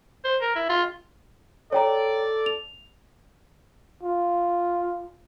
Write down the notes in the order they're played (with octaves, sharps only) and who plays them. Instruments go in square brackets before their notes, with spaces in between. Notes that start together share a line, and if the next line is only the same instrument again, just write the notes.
[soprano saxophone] C5
A#4
E4
F4
[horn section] A4 D5 [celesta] C#5 G5 A#5
[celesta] F7
[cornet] F4